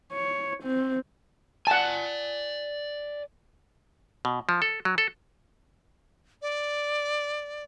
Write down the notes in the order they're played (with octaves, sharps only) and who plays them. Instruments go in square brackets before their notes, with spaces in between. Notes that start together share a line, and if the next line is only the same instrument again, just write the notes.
[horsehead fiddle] C#5
C4
[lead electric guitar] D5 G#5 [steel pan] F#5 A5
[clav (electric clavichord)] B2
F3
A4
F#3
A4
[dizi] D5